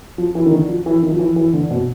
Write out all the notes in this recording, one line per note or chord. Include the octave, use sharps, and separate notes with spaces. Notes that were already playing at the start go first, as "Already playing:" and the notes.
F3
E3
D#3
D3
F3
E3
D#3
F3
E3
E3
D3
B2